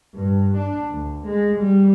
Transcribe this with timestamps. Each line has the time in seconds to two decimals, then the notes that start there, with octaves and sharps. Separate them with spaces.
0.15 G2
0.57 D4
0.91 D2
1.27 G#3
1.59 G3